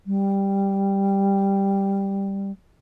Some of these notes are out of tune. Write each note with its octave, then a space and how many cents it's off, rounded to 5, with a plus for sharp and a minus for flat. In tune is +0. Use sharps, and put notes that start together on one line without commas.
G3 +5